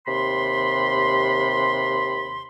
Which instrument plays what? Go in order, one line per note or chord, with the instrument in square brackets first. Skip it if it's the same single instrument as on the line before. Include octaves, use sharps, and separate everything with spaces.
[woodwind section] D#2 C3 B5 C6